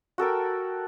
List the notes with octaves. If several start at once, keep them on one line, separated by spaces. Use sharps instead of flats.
F#4 A4 A#4 G5